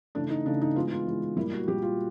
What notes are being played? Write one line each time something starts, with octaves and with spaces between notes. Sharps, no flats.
C#3 E3 A3 D4
D#4
C#3 E3 A3 D4
D#4
E3 G#3 B3 F4
F4
E3 G#3 B3
A#2 G3 A#3 E4
F#4
A#2 G3 A#3 G4
F4